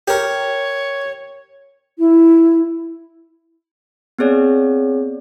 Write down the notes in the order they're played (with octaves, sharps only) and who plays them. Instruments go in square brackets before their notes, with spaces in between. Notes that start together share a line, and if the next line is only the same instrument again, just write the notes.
[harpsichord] G4 A#4 [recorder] C#5
[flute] E4
[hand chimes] B3 C4 G#4 C#5 D5